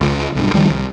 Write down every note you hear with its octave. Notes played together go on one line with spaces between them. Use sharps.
C#2
B1 G2
C#2 D#3 F3 G3
C2